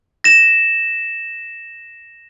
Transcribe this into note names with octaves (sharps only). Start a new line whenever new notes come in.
A#6 E7